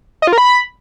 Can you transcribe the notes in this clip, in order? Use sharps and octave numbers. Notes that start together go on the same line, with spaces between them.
D#5
F4
A#4
B5